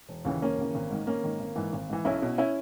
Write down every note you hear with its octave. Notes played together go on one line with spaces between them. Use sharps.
E1
D#2 C#3 E3
E1 A#3 C#4
D#2 C#3 E3
G#1
G#2 D#3
G#1 A#3 C#4
G#2 D#3
G#1
G#2 E3
G#1
G#2 E3
B1 C#4 E4
B2
C#4 E4